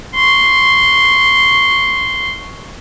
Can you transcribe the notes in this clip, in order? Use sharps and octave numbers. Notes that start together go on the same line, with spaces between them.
C6 C#6